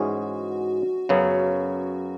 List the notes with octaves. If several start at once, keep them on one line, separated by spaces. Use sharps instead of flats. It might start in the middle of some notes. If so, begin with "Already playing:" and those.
Already playing: G#2 E3 G#3 C#4 F#4 G#4
F#2 C#3 F#3 B3